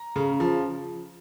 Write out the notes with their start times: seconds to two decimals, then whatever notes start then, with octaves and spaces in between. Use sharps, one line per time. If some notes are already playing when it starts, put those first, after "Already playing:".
Already playing: A#5
0.16 C#3
0.40 F3